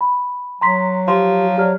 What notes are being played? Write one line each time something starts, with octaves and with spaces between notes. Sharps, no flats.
B5
F#3 A#5 C6 B6
F3 G4 C6
F#3 G4 D5 F6